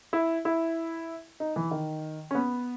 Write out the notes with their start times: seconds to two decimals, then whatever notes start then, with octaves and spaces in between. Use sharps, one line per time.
0.13 E4
0.45 E4
1.40 D#4
1.56 E3
1.71 D#3
2.31 C#4
2.35 B3